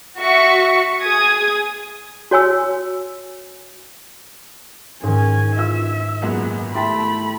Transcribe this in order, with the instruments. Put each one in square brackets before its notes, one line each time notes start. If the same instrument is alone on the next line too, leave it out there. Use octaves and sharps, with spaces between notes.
[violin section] F#4 E5 C#6
G#4 D#6 G#6
[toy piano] F#4 C#5 G#5 E6
[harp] G#2 D#3 [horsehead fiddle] C#4 G#5
[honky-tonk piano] E3 F4 E6 [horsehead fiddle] E5
[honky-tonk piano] F#2 A#2 G#3 [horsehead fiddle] B3 [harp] F#5
[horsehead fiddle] A3 B5 [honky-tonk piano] E4 G4 A5 [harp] C6 A6 B6